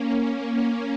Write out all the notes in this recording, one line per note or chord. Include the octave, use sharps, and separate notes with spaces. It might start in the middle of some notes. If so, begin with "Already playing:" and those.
Already playing: A#3 C#4
A#3 C#4